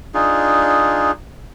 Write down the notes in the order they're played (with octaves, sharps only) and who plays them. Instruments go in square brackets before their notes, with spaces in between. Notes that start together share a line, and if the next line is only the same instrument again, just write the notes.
[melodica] D4 D#4 F4 G#4